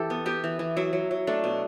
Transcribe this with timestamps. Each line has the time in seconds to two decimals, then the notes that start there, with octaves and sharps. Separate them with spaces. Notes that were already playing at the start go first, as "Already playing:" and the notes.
Already playing: E3 G4 A4
0.10 B3
0.26 B3 G4
0.44 E3
0.59 E3
0.76 F#3 E4
0.93 F#3
1.11 F#3
1.27 A3 D4
1.44 B2